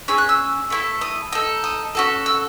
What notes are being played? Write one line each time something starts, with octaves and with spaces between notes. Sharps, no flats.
C#4 G#4 E6
F#6
E6
A3 E4 A4
D#6
D#4 A4
D#6
C#4 F#4 A4
E6